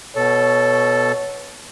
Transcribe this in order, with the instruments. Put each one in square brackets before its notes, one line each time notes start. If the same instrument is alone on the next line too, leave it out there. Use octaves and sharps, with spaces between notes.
[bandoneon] B2 A4 [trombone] C#5